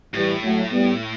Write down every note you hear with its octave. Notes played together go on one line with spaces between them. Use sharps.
A2 E3 G3
F#3 A3
G3 B3